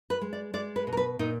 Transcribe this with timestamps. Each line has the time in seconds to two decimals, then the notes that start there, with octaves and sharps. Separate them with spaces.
0.10 B4
0.21 G#3
0.33 D5
0.54 G#3 D5
0.76 B4
0.87 B2
0.93 A#4
0.97 B4
1.19 A#2 D#4